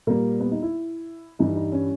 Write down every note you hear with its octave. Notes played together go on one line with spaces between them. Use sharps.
A#2 G3 A#3
B3
D#4
E4
G2 E3 G3 D#4
D#4
C#4